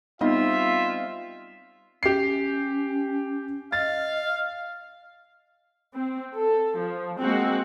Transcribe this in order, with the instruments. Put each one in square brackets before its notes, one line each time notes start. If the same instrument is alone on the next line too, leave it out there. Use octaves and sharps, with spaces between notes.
[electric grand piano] G3 C4 D#5 [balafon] B3 D#4 [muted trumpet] F4 [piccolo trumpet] E5
[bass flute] C#4 [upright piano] G4 C7
[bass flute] D#5 [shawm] F5 [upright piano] A6
[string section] C4
A4
F3
G#3 A#3 C4 F#4